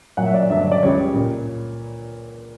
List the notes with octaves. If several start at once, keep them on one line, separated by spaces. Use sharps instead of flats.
A#2 F#3 F#5
E5
D5
G2 D3 F#3 E5
D5
D5
C#2 C#3 G3 C#5
A#2